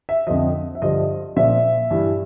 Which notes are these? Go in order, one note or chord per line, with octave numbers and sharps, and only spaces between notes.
E5
F2 D3 F3 D#5
E5
G2 D3 F3 D#5
A#2 F3 E5
G2 E3